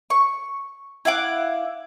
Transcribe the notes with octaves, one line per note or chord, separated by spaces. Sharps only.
C#6
E4 F5 F#5 D6